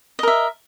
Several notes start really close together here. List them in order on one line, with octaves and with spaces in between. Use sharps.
D#5 A#4 E5